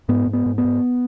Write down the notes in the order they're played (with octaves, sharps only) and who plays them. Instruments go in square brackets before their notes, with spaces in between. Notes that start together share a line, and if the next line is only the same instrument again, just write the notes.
[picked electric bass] G#2 B3
G#2
B3
G#2
B3
G#2